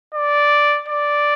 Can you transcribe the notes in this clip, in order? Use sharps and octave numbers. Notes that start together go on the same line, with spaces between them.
D5
D5